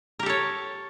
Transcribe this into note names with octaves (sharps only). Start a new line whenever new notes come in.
G4 A4 A#4 C#5